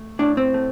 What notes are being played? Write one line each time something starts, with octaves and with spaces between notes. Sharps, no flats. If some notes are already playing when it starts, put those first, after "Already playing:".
Already playing: A3
A2 D4
C4
A3